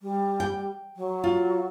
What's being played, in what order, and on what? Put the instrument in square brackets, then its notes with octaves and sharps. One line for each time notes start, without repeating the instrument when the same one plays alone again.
[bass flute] G3
[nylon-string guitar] G5
[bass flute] F#3
[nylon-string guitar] F4